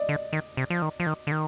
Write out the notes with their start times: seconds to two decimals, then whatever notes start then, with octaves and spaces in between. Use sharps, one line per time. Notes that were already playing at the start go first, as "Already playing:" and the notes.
Already playing: D5 D#5
0.09 D3
0.33 D#3
0.57 C3
0.70 F3
0.82 D#3
1.00 F3
1.07 D#3
1.27 D3
1.32 D#3